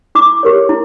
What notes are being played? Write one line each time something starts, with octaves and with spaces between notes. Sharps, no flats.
E4 D6
G4 A#4 C#5
E4